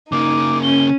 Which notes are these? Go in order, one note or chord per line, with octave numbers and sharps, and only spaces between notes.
C#3 A#3 D#4 D6
C#4 G7